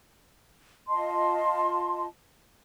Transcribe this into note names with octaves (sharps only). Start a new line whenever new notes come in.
F4 D#5 A5 C6